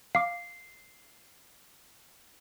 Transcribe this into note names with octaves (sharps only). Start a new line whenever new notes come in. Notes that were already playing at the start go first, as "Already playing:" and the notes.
F5 D6 C7